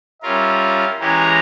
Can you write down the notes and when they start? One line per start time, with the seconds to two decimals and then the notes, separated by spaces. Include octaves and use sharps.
0.22 G3 C#4 F4 A#4 E5
1.00 E3 G#3 C#4 G4 C#5 A#5